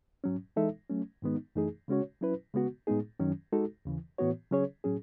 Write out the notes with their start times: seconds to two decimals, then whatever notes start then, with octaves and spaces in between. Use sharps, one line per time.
0.24 G#2 F#3 C#4
0.56 E3 G#3 D#4 A4 E5
0.90 F#3 A3 C#4
1.22 G#2 D#3 G#3 B3 D#4
1.56 F#2 E3 A3 D#4 G#4
1.88 C#3 G#3 C#4 F#4 C#5
2.21 F#3 C#4 E4 B4
2.54 C#3 G#3 B3 F#4
2.87 A2 G#3 B3 D#4 G#4
3.19 F#2 D#3 F#3 C#4
3.52 G#3 D#4 F#4 A4
3.85 D#2 C#3 E3
4.18 A2 E3 B3 F#4 C#5
4.51 C#3 F#3 C#4 G#4 C#5
4.84 A2 F#3 C#4 G#4